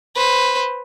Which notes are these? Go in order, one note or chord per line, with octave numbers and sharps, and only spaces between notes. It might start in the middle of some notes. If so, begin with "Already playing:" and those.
B4 C5